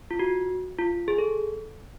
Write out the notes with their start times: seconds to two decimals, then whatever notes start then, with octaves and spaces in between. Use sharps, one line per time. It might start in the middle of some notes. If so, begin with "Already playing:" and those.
0.11 F4
0.19 F#4
0.79 F4
1.08 G#4
1.18 A4